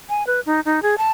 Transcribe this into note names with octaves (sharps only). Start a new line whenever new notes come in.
G#5
B4
D#4
D#4
G#4
A5